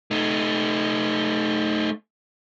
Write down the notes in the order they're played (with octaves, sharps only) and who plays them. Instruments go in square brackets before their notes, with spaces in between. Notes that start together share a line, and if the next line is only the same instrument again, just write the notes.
[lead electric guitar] A3 D#4